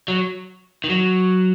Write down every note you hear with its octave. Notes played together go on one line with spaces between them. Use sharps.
F#3
D#3
F#3